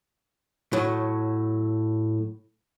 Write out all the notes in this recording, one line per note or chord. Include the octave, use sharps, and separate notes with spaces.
A2 F#3